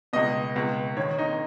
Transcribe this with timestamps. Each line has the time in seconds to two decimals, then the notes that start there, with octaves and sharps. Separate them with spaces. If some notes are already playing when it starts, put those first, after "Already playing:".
0.13 C#2 B2 D#5
0.55 C#2 B2
0.96 D#2 D#3 C#5
1.18 D#4